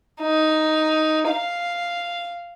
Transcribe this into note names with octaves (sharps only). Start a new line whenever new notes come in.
D#4
F5